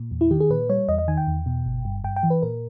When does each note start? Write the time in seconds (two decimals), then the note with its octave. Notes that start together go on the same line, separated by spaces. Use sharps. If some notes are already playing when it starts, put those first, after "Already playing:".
Already playing: A#2
0.11 E2
0.21 E4
0.31 D#3 G4
0.40 G#4
0.50 A#2 B4
0.69 G3 C#5
0.88 E2 D#5
0.98 D#5
1.08 D#3 G#5
1.17 G5
1.27 E2
1.46 B2
1.66 G1
1.85 G2
2.04 G2 G5
2.16 G5
2.23 E3
2.30 B4
2.42 A#2 A#4